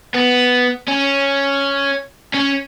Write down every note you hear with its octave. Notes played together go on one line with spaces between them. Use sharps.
B3
C#4
C#4